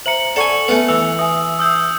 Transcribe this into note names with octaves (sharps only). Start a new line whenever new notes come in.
C5 E5 A#5 C#7 F#7
A4 D5 F#5 G#5 C#6
A3 B3 B4 G#5
E3 E6
E5 G#5 D#6
D#6 E6 G6